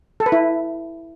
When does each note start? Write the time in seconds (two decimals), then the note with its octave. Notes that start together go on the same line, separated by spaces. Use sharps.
0.20 A4
0.26 B4
0.32 E4